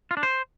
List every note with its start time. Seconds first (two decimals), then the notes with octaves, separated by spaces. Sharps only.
0.11 F4
0.17 D4
0.23 C5